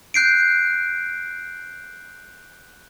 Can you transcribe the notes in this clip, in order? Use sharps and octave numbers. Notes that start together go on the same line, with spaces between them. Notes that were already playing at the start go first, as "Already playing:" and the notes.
F#6 G6 C7 D7